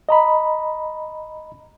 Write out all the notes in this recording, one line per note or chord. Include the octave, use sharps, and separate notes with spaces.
D#5 A#5 B5